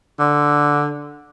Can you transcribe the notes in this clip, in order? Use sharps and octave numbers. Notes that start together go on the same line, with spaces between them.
D3